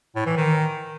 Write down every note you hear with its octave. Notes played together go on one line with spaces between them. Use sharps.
A2
E3
D#3